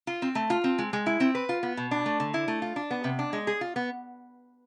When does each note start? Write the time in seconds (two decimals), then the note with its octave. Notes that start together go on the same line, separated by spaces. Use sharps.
0.07 F4
0.22 C4
0.35 A3
0.50 F4
0.64 C4
0.78 G#3
0.93 G#3
1.06 E4
1.20 C4
1.35 B4
1.49 F4
1.63 B3
1.77 B2
1.91 D4
2.06 A3
2.20 D3
2.34 E4
2.48 A3
2.62 F4
2.76 D4
2.91 B3
3.04 C3
3.19 D4
3.33 G#3
3.47 G#4
3.61 F4
3.76 B3